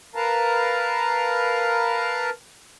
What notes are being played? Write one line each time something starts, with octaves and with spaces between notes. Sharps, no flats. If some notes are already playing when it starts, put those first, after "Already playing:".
A#4 B4 F5 A5 A#5